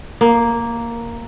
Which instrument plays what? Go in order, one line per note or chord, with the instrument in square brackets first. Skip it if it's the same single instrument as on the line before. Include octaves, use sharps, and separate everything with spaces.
[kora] A#3